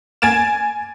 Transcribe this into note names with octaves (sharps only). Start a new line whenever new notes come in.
G#5 G#6 A6 D7 E7